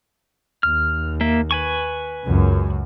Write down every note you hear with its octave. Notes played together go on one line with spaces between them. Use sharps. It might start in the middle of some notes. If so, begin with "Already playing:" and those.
D#2 F6
A#3 E5
B4 G#5 C#6
C#2 F#2